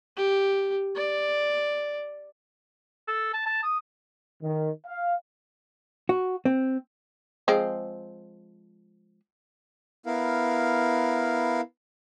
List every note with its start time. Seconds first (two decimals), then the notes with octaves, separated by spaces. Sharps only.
0.17 G4
0.95 D5
3.08 A4
3.33 A5
3.46 A5
3.63 D#6
4.42 D#3
4.86 F5
6.09 F#4
6.45 C4
7.48 F3 G#3 C4
10.06 B3 E4 A#4 F5